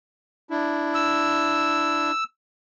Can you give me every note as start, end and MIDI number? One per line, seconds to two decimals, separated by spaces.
0.51 2.11 62
0.51 2.11 64
0.95 2.24 88